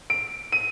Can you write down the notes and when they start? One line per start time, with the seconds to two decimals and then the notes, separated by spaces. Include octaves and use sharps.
0.10 D7
0.52 D#7